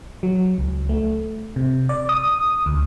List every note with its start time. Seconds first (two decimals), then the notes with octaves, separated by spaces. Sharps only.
0.23 F#3
0.58 C#2
0.89 A3
1.56 C3
1.89 D5
2.09 D#6
2.66 D2